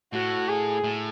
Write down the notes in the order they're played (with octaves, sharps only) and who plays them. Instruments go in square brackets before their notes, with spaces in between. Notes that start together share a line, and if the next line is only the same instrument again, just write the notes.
[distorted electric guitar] A2 [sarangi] F#4
[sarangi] G#4
[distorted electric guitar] A2